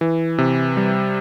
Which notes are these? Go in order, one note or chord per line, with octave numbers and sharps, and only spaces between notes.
E3
C3
G3